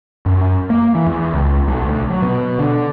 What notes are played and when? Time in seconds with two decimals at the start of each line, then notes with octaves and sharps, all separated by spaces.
0.26 F#2
0.70 A#3
0.95 E3
1.07 E2
1.33 C#2
1.68 B1
1.85 D2
2.10 F#3
2.22 B2
2.59 D3